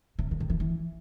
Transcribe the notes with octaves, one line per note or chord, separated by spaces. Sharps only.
C3
D3
C3
E3
E3